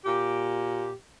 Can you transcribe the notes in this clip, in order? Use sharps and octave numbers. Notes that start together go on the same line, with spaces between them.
A#2 G4